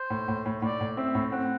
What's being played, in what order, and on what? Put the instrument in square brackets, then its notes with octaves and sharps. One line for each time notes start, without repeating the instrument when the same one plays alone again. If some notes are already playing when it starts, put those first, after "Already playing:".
Already playing: [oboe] C5
[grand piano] A2
A2
A2
[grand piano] A2 [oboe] D5
[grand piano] A2
[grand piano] C4 [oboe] E5
[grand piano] A2
[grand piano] C4 [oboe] F#5